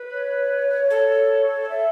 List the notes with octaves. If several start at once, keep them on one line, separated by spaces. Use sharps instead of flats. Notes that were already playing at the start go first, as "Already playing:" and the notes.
Already playing: B4
C#5
A4
E5